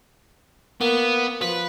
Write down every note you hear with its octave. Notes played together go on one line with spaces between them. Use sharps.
A#3 B3
F3 B4